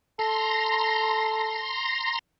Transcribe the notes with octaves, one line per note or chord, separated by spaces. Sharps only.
A4 A#5 C6